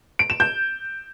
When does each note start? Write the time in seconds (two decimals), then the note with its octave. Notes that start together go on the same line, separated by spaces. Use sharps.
0.19 D7
0.30 E7
0.40 G6